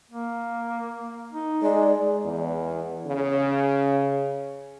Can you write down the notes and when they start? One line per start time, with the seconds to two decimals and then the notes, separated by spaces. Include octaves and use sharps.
0.11 A#3
1.32 D#4
1.62 G#3 D#4 D5
2.25 E2
3.07 C#3